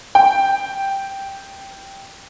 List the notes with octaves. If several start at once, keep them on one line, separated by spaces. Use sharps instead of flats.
G5